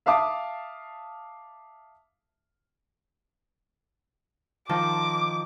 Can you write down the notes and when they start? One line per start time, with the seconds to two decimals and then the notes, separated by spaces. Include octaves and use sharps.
0.06 E5 F5 A5 D6 D#6
4.69 D#3 F3 A5 D6